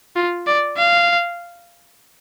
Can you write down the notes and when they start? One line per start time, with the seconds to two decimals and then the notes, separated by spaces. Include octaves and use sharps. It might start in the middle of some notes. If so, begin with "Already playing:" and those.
0.16 F4
0.47 D5
0.78 F5